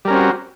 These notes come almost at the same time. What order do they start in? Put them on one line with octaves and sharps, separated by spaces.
G3 A#4 C#4 C4 F#4